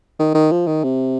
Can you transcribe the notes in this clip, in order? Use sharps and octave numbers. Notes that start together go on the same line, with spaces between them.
D#3
D#3
F3
D#3
C3